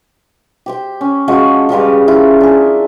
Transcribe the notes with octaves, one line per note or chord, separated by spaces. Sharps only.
G4 C5 G5
C#4
F3 G#3 C#4 F#4
C#3 F3 G3 B4
E4 F4 A#4
D4 G#4